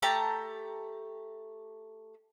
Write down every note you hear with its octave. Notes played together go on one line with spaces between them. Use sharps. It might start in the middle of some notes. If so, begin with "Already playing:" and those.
A3 G4 A5 A#5